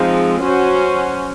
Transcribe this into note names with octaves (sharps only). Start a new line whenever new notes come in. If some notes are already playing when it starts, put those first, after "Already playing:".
Already playing: F3 G#3 C4 D#4
F#3 C#4 F#4 C5